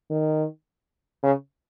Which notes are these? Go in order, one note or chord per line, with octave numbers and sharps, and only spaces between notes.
D#3
C#3